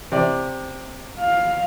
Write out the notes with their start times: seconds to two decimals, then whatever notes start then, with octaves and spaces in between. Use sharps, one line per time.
0.12 C3 D5
1.20 F5